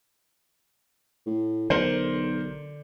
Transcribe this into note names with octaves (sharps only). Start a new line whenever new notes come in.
A2
B1 D3 A#4 C5